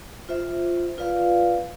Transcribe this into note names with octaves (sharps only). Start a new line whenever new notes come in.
F4 C5 E5
F4 B4 D5 F5